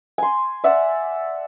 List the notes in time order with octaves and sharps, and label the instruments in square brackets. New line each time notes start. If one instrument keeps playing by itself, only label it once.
[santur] G#5 C6
D5 E5 F#5